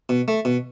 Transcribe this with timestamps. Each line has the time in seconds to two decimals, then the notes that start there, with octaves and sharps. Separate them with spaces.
0.09 B2
0.28 A3
0.45 B2